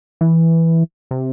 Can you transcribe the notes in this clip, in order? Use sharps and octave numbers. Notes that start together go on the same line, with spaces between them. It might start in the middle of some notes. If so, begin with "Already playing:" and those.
E3
C3